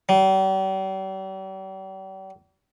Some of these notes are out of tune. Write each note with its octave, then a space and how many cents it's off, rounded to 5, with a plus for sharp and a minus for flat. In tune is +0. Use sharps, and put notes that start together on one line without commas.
G3 -45